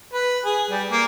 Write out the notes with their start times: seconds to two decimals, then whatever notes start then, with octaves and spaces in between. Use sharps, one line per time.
0.14 B4
0.45 G#4
0.70 G3
0.91 A#3